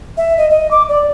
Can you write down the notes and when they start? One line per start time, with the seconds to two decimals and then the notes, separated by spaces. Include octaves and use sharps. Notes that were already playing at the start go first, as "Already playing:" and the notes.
0.17 E5
0.38 D#5
0.50 D#5
0.71 D6
0.89 D5